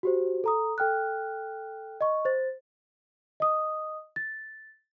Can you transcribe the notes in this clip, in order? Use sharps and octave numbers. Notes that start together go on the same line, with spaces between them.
F#4 G4 C5
A4 A#5 D#6
A4 G5 F6 F#6
D#5 C#6
C5 A6
D#5 D#6
A6